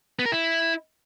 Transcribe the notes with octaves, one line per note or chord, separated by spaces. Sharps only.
B3
A#4
E4